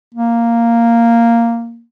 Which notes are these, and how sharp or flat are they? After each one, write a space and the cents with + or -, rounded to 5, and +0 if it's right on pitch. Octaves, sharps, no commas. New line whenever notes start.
A#3 -5